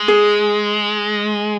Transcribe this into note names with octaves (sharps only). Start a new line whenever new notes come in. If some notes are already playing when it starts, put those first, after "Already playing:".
Already playing: G#3
G#4